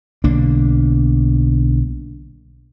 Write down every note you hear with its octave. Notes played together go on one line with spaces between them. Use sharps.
B1 D3 A#3 D4